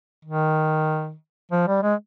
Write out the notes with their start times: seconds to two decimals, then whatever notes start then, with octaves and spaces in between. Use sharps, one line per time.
0.25 D#3
1.51 F3
1.68 G3
1.83 G#3